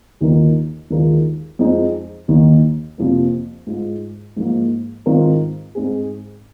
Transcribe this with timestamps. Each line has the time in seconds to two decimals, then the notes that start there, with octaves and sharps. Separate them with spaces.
0.21 D#2 D#3 A#3 F4 A#4
0.90 D#2 D#3 G#3 F4 A#4
1.59 F2 F3 G#3 D#4
2.28 D#2 D#3 A#3
2.98 F2 C3 F3 A#3
3.67 G#2 G#3 F4
4.37 G#2 F3 A#3
5.06 G#2 D#3 C4 F4 A#4
5.75 G#2 G#3 C4 G#4